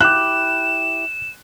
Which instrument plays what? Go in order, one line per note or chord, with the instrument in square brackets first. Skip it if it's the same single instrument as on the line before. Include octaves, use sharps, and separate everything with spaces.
[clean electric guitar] E4 G4 [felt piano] F#6 [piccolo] E7